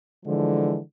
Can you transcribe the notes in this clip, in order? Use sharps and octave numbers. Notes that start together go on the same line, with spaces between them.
D3 E3 F3 G#3